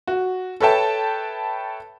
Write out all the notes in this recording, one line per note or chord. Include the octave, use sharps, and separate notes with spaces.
F#4
A4 B4 C#5 E5 G5 A5